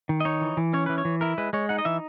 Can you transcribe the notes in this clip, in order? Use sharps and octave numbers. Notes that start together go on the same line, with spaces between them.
D#3
D#5
D#4 C#5
E3
E3
C#4 C#5
E3 B4
C#5
E3
E4 A#4
G#3 B4
G#3 C#5
D#4 F#5
D#5
E3 E5